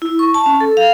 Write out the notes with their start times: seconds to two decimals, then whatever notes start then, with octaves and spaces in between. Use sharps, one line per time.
0.02 E4
0.19 C#6
0.34 A5
0.46 C#4
0.61 A4
0.77 F5